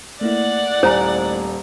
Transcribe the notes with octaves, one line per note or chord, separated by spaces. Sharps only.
A3 A#3 E4 D5 F#5
D#1 C5 G#5 A#5